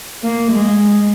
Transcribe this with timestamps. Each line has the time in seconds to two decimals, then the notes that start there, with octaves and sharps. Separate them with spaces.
0.23 A#3
0.52 G#3